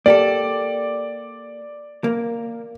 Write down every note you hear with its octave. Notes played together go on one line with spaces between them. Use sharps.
A#3 G4 A4 D5
A#3